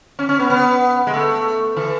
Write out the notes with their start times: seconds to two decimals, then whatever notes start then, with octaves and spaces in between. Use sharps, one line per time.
0.19 C#4
0.29 C#4
0.39 B3
0.50 B3
1.07 G#3
1.13 A3
1.77 E3